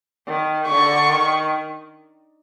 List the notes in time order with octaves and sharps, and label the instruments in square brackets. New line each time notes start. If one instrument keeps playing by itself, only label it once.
[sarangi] D#3
[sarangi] D3 [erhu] C#6
[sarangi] D#3